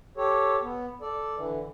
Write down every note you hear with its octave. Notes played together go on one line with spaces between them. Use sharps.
G4 A4 C#5
B3
A4 D5
D3 E3